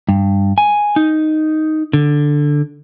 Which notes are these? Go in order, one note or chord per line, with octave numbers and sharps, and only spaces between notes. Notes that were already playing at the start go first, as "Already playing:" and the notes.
G2
G#5
D#4
D3